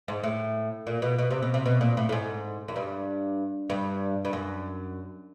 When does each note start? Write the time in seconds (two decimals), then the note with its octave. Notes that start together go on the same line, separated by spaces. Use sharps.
0.08 G#2
0.23 A2
0.87 A#2
1.02 B2
1.18 B2
1.31 C3
1.42 B2
1.54 C3
1.66 B2
1.81 A#2
1.97 A2
2.09 A2
2.12 G#2
2.68 F#2
2.76 G2
3.70 G2
4.25 G2
4.33 F#2